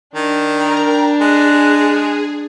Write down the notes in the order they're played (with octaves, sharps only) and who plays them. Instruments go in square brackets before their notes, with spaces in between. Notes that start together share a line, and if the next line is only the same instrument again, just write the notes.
[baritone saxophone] D#3 [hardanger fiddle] D4
[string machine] A#4 G5 [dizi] A#5
[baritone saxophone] G#3 [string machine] G#4 [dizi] F#6